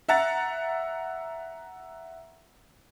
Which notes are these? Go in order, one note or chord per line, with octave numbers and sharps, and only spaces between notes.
E5 F#5 A#5 A6